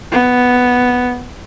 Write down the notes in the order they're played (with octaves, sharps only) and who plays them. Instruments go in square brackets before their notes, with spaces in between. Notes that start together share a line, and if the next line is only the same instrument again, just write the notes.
[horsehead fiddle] B3